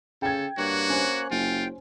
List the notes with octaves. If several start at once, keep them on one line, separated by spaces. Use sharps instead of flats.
C#3 A4 G5 G#6
G2 A#3 F#4 C#5 F#6
C#4 C5
F#1 F4 G5